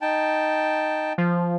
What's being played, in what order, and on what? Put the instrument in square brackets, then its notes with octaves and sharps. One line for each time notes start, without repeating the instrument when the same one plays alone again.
[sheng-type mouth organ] D#4 G5 A5
[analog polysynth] F3